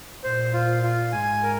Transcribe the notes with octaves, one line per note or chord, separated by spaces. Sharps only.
A#2 C5
F4
F4
G#2 G#5
A#4